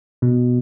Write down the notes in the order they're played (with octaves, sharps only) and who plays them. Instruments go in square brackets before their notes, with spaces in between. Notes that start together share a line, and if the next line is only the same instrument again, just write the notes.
[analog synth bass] B2